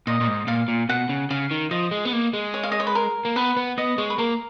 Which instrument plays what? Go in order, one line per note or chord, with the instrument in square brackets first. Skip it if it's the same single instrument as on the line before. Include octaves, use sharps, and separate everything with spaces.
[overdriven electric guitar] A#2 [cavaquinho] D#5
[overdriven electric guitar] A#2
G#2
[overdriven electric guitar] A#2 [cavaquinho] F5
[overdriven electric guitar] A#2
[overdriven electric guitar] B2 [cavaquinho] F#5
[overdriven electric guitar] C#3
[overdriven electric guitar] C#3 [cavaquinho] F5
[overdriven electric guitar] D#3
[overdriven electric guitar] F3 [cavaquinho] D#5
[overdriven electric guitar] G#3
B3
A#3
G#3
[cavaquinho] C#5
F5
D#5
C#5
B4
A#4
[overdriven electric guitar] A#3
[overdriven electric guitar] B3 [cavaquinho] B4
[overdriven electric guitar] B3
[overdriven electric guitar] B3 [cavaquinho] D#5
[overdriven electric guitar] G#3 [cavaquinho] C#5
[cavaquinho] B4
[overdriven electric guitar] A#3 [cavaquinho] A#4